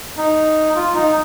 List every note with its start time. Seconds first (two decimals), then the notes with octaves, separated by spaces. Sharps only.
0.17 D#4
0.75 F4
0.95 D#4